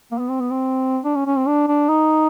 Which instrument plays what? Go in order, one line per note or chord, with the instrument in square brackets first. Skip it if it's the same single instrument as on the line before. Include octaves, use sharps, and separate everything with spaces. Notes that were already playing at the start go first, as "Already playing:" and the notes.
[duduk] A#3
B3
C4
B3
C4
D4
C#4
C#4
C4
D4
D4
D#4